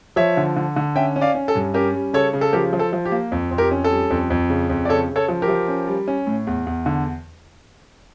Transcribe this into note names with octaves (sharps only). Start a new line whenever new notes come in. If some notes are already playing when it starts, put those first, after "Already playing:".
F3 C#5 E5
D3
D3
D3
C#4 E5 G5
C#4
D5 F5
C#4
A4
G2
C#4 G4 A#4
G3
C#3 A4 C#5
C#3
A4
F3 G4 A#4
F3
A4
F3
G4
A#3
F2
F2
G4 A#4
C#4
A4
G3
F2
F2
C#3
F2
D5
C#3 A4 C#5
C#3
A4 C#5
F3
G4 A#4
F3
C#4
G3
C#4
A2
E2
E2
D3